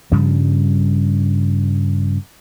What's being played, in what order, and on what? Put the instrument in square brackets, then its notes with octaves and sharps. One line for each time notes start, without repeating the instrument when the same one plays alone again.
[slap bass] G2 C#3 F3 G3